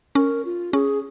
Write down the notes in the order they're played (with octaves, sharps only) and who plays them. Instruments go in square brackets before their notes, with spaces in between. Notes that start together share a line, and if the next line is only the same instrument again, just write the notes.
[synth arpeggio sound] C#4 [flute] A#4
[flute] F4
[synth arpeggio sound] C#4 [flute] G#4